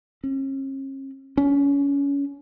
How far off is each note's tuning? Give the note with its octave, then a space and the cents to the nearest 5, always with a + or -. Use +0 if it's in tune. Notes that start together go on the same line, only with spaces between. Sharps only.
C#4 -40
C#4 +25